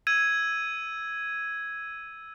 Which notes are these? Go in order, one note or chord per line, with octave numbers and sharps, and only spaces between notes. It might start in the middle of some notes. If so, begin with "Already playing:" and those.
E6 G#6 D#7